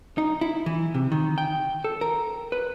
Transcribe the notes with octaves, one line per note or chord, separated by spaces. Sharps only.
D#4
E4
E3
C3
D#3
G5
A4
A#4
B4